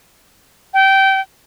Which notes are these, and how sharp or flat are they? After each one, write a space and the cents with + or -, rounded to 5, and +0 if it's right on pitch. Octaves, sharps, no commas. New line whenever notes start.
G5 -20